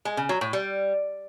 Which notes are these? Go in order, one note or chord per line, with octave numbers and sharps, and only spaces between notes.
G#3
C#3
F#3
A2
G3